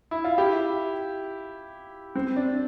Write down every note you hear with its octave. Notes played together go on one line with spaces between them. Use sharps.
E4
F4
E4 G4
C4
D4